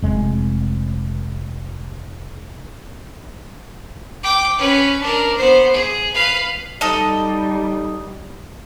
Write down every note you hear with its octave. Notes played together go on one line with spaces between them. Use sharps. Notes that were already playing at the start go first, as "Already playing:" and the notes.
F1 G#3
G5 D6
C#4 B4
D4 A#4
B3 C5
G#4
B4 F5
G3 D#4 A4 D#5